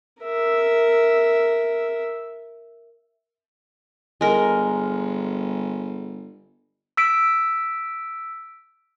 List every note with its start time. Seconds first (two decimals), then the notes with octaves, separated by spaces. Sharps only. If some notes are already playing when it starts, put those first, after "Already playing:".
0.22 A#4 E5
4.21 G1 G#3 A#4
6.97 E6 B6 D7